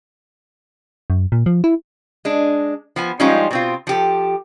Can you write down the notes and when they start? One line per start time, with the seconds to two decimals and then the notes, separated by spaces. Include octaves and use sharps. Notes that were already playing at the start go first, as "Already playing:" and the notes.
1.10 F#2
1.32 A#2
1.46 F3
1.64 E4
2.25 G#3 D4
2.96 F3 B3 G#5
3.20 F3 G3 G#3 C#4 D#4 F4
3.51 B2 C4 F4
3.87 F3 G4 A4